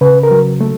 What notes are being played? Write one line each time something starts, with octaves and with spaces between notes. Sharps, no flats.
C#3 B4
A#4
F#3
A3